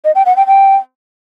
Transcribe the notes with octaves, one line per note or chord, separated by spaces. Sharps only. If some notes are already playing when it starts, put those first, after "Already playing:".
D#5
G5
F#5
G5
G5